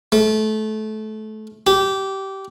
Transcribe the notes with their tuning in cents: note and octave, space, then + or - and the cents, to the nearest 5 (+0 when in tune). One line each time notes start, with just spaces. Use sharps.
A3 -25
G4 -20